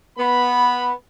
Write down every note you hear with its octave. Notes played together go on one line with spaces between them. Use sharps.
B3 B5